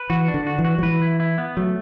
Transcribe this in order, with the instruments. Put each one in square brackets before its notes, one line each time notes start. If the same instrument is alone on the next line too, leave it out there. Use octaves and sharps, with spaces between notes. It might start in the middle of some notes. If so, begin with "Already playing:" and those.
Already playing: [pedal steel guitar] B4
[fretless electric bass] E3 [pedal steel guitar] F#4
[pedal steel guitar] D4
[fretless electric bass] D3
[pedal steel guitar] F#4
[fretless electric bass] E3
[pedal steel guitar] F#4
[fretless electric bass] F#3
[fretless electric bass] E3 [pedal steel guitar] B4
[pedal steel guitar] E4
E4
B3
[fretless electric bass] F#3 [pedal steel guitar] A3